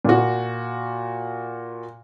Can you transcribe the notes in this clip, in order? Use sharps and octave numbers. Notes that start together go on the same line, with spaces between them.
A#2 F#4